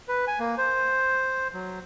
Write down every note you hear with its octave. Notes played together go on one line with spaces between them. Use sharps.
B4
G#5
A#3
C5
F#3